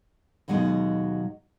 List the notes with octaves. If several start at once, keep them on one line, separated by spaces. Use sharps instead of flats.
D#2 B2 F#3 G#3 C#4 D#4